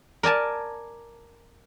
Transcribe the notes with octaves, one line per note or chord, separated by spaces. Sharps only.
A#4 D5 G#5 A5